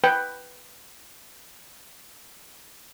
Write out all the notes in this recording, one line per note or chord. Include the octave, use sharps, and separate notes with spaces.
B4 G5